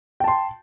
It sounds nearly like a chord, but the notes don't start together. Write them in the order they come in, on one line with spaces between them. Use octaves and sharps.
G5 A5 C6